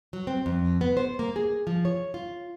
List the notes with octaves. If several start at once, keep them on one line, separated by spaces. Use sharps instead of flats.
F#3
C4
F2
B3
C5
A#3
G#4
F3
C#5
F4